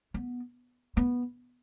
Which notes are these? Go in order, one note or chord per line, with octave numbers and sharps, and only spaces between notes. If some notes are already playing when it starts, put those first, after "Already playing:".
B3
B3